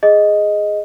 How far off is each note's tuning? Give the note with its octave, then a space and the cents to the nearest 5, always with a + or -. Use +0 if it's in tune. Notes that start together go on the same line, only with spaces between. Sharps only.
G#4 +0 D#5 +0